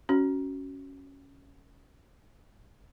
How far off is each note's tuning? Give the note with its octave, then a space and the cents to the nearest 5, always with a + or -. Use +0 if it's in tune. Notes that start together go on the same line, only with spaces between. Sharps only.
C#4 +0 F#4 +15